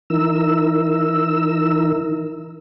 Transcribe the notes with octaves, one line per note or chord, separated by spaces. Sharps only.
E3 D#4 E4 A#4 E6